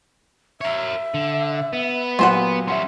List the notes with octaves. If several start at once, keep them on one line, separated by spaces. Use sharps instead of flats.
A#4 C#5 E5
D3
B3
A#2 F#3 F4 G4 C5 F#5
G3 C#4 E5 F#5 C6